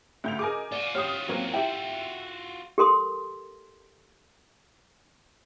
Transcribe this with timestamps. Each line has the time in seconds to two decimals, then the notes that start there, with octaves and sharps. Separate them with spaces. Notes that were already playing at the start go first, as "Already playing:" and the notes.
0.24 D2 G6 F7
0.39 G#4 A#4 D#5 G#5 D6
0.72 F4 F#4 D5
0.95 G4 C#5 D#6 F6
1.28 F#3 A#3 C4 C#5 F5
1.54 E4 G4 G5
2.78 G4 A4 A#4 C6 D#6